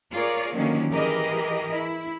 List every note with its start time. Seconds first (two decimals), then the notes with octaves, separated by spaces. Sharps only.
0.13 F4 G#4 A#4 C#5 D5
0.55 D3 D#3 F3 F#3 A#3 C#4
0.90 E3 G4 G#4 A#4 D#5
1.71 E4